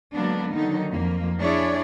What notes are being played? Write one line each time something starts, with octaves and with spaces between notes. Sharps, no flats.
D3 F#3 G#3 A#3 B3 D4
D3 D#3 F#3 D#4
F2 A#3
D4 E4 G#4 C#5 D5